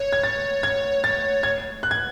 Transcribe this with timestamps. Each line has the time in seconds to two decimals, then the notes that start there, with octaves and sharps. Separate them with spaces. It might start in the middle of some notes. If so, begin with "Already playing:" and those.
Already playing: C#5
0.13 G#6
0.23 A6
0.63 G#6
1.04 A6
1.43 G#6
1.83 F#6
1.91 G#6